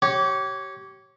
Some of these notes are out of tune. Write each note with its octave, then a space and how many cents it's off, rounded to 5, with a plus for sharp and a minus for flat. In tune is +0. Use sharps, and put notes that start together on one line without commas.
G4 -30 C#5 -10